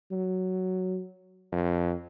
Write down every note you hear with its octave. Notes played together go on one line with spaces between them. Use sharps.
F#3
F2